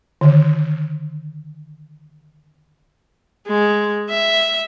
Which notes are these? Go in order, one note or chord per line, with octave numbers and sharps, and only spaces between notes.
D3 D#3
G#3
E5